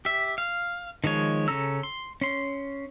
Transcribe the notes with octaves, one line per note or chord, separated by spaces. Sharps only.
G4 E5
F5
D#3 F3 G#3 C#5
C#3 C#4 A4 A#5 E6
C6
C#4 C6